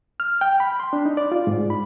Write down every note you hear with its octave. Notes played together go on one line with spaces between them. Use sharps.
F6
G5
B5
C6
D4
D#4
D5
F4
G#2
B5